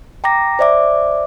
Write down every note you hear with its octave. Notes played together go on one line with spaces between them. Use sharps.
G5 A#5 D6 A#6
C5 D5 E5 D6